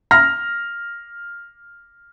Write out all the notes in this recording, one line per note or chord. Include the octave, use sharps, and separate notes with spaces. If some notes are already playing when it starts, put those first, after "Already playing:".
F6 A#6